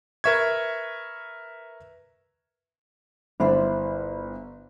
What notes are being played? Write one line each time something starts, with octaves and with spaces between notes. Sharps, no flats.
A#4 B4 E5 C#6 G#6
G1 D4 E4 C5